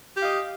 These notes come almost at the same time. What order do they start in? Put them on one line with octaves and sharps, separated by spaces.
G4 F5 D#5